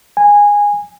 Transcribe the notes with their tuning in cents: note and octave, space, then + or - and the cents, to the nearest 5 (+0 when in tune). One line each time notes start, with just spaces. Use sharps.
G#5 -15